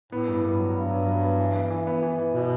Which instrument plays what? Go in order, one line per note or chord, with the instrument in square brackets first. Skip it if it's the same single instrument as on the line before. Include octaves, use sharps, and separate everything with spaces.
[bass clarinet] A2 [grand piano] B3
[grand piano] G2
G2
F#3
[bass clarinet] G2 [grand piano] F#3
[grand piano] F#3
F#3
B3
E3
B3
E3
B3
E3
E3
[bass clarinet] B2